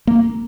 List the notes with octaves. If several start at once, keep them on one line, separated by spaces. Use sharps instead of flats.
A#3